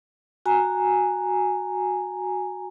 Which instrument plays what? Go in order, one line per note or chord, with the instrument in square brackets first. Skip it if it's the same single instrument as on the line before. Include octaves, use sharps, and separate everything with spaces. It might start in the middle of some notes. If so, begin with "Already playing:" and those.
[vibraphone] F#4 G#5 A#5